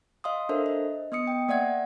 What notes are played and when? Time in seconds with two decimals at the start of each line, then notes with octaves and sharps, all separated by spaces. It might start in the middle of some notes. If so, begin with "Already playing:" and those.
0.24 D#5 F5 C6 D#6
0.49 D4 A4 A#4 C5 E5
0.66 D#5
1.12 B3 D#5 D#6 C#7
1.27 G5
1.49 A#3 D5 E5 F#5 G#6